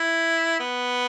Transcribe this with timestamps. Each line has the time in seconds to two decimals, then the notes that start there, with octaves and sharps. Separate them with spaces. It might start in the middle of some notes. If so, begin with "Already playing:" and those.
Already playing: E4
0.60 B3